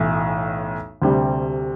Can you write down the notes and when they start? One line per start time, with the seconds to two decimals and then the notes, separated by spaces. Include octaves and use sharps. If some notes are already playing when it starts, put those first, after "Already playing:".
Already playing: B1 A2 E3
1.02 D2 C3 G3